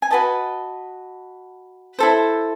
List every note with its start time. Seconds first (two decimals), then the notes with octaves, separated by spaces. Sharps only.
0.02 G#5
0.10 F#4 B4 D#5 A5
1.99 E4 A4 C5